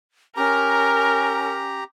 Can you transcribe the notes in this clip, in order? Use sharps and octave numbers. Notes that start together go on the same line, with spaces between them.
C#4 G4 A#4 A#5